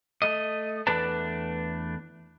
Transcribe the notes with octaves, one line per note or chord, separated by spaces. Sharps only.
A3 D#5
E2 A3 D4 B4 D5 A5